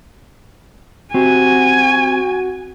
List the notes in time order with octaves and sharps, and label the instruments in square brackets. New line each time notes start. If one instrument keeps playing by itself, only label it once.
[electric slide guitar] C4 G4 [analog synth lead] F#4 [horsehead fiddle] G#5